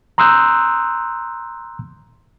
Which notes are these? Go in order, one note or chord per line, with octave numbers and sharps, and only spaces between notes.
A#5 C6 D#6 E6 F#6 G6